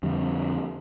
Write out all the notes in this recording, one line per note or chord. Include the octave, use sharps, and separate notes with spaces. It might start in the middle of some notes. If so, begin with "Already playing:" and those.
F2 D3 G3